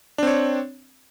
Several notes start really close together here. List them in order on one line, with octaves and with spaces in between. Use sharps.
D4 C4 C#5